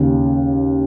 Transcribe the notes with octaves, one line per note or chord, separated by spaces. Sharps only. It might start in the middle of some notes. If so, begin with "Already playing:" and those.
Already playing: D#2 C#3